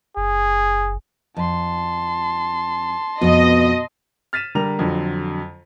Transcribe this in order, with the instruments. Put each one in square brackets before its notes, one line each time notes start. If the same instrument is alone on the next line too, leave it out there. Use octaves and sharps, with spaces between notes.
[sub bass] F#1 [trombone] G#4
[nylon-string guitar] F2 [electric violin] A5 C6
[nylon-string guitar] F2 B3 [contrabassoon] B2 [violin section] D#5
[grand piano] F6 A6 B6 D#7 E7
D3 G3 A#4 A#5 F7
F2 D3 F#3